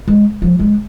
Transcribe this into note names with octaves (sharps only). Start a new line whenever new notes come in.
G#3
F3
G#3